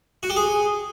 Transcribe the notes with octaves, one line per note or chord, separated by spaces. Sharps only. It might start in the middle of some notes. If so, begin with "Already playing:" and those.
F#4
G4
G#4